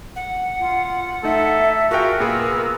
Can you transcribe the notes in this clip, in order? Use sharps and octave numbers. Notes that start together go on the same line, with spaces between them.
F#5
F4
A3 D#4 A4 E5
F4 F#4 G#4 A#4 G5
A#2 B3 F4 G#4 E6